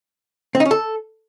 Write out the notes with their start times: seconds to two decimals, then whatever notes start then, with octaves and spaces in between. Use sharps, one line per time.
0.55 C4
0.60 D#4
0.65 C#4
0.71 A4